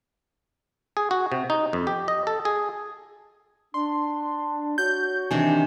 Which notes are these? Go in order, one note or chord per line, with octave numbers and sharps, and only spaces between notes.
G#4
F#4
C3
D#4
F2
G4
D#5
A4
G#4
D4 C6
F#4 C#5 G6
C3 D#3 E3 D4 G#5